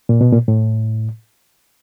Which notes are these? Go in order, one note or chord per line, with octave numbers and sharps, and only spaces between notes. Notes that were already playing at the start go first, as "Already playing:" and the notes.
A#2
B2
A#2
A2